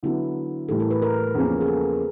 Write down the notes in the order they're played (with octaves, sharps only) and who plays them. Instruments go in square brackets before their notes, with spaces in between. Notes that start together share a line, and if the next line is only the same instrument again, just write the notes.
[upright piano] D3 F#3 B3 [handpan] E4
[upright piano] A2 E3 G3 [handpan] A4
[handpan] A#4
B4
A#4
[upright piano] E2 C#3 F3 A#3 C#4
[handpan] G#4
A4